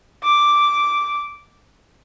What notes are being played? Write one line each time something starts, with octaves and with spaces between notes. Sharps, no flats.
D6